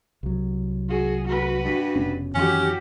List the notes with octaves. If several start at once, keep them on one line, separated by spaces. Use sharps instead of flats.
C2 F#3
F#4 G#4
F#4 B4
G2
F1 B2 C#4
F#2 D#3 E3 C#4 F#4 G4